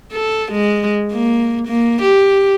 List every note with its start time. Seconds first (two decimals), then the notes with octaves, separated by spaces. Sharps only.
0.13 A4
0.52 G#3
1.13 A#3
1.68 A#3
2.02 G4